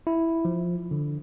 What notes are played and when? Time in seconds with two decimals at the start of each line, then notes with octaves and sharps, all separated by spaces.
0.07 E4
0.45 F3
0.91 D3